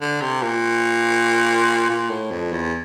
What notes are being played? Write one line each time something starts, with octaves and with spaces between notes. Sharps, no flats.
D3
C3
A#2
A#2
A2
F2
E2